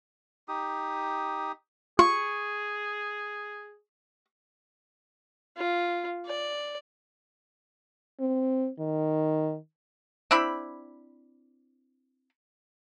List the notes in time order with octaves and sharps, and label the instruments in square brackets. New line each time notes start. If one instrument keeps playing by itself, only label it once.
[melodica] D#4 G4 D#6
[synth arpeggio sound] F4 [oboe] G#4 [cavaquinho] C#6
[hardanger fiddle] F4
D5
[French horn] C4
D#3
[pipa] C4 D4 E4 B5